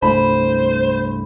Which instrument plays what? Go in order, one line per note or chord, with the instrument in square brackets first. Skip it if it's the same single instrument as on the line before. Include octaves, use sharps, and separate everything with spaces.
[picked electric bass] C2 G2 A3 [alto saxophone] C5 [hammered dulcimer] B5